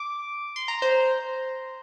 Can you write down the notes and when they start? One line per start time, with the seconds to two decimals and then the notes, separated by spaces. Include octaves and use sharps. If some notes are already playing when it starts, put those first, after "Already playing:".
Already playing: D6
0.56 C6
0.68 A#5
0.82 C5